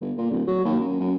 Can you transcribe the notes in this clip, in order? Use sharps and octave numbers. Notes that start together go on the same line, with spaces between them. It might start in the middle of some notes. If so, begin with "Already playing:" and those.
G1
A#2
D1
F#3
D#2
F#2
F#2